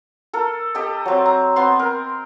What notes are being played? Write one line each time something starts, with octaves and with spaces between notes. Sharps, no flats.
A4 A#4
G4 A4 D#5
F#3 C4
A#5
B3 C4 C6
A#4